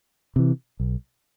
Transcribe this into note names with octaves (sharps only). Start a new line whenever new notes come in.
C3 E3
B1